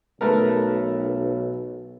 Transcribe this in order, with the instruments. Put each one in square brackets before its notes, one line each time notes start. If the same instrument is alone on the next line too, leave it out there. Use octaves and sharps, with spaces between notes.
[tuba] B1 [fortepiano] A3 B3 A#4